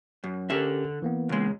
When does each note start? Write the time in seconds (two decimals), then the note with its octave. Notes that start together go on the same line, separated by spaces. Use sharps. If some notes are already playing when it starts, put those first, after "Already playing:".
0.24 F#2
0.50 D3 C#4 G4 A#4 E5
1.02 E3 A#3 B3
1.29 C#2 G#3